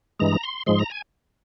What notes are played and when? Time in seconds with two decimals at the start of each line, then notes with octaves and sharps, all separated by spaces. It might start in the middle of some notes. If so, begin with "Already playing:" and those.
0.20 G2 E3 G#3 A#5
0.43 C6
0.66 G#2 F3 G#3 C6
0.79 A#5
0.90 G#5